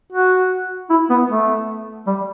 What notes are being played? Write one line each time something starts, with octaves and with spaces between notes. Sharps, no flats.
F#4
E4
B3
A3
G3